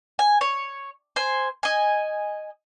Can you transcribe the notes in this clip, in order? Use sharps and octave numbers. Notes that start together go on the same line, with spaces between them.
G#5
C#5
C5 G#5
D#5 G#5